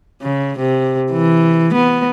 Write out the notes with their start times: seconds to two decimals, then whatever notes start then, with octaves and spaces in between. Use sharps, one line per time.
0.22 C#3
0.58 C3
1.12 E3
1.73 B3